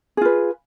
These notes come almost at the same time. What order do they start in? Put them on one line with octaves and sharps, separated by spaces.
G#4 F4 B4